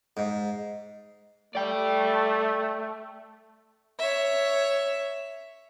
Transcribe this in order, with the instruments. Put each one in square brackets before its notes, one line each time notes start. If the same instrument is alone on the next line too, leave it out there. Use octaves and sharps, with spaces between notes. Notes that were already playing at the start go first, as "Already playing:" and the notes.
[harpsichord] G#2
[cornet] A3 [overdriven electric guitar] D5 G5
[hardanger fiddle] C#5 E5